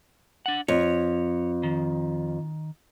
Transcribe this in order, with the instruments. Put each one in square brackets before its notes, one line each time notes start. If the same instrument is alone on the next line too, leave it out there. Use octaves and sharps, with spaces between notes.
[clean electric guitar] D4 F#5
[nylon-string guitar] F2 [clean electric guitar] C#5
[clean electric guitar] D#3